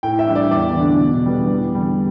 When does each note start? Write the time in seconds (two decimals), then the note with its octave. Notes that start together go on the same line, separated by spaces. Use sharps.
0.03 A2 G5
0.19 E5
0.27 G3 D4
0.35 D5
0.51 E2 D5
0.76 D3 A3 D4
1.01 B2
1.25 G3 B3 D4
1.50 E2
1.74 D3 G3